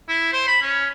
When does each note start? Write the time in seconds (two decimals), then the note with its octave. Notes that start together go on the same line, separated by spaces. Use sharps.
0.09 E4
0.33 C5
0.47 B5
0.62 C#4